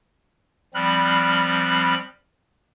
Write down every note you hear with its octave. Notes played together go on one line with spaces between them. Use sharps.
F3 G3 C4 B5 F6 F#6